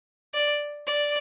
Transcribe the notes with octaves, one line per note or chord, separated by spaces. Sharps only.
D5
D5